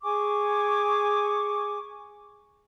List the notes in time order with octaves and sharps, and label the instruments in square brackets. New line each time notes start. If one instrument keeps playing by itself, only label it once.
[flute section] G#4 G#5 C#6 D6